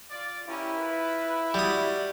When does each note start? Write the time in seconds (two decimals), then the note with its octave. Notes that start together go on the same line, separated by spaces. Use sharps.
0.10 F4 D5
0.48 C#4 E4 G4 A#4
0.80 F4 B4
1.54 G3 F#4 D5 D#6